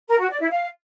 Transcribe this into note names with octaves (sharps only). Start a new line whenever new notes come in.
A#4
F#4
D5
E4
F5